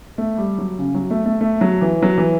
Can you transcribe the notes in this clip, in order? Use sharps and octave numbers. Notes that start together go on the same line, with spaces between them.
A3
G3
F#3
C#3
F#3
A3
A3
A3
F#3
E3
F#3
E3